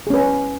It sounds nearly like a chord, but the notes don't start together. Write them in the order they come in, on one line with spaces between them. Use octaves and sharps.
G#4 C#4 B4